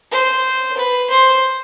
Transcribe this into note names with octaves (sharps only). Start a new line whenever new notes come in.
C5
B4
C5